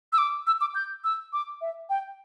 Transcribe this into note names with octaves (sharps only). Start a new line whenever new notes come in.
E6
D6
E6
D6
G6
E6
D6
E5
G5